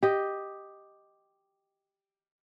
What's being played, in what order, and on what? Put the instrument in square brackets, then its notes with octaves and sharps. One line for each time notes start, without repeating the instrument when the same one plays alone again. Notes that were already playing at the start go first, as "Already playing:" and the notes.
[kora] G4 D#5